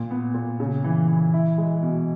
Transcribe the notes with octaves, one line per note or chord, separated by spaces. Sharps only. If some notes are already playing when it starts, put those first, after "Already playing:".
Already playing: A#2
B3
A#2
C#3
E3
E3
E4
G#3
B2